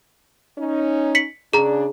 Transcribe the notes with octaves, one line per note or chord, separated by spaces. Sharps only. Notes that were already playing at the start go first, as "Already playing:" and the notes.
C#4 D#4
B6 C#7 F#7
C#3 D4 G#4 A#5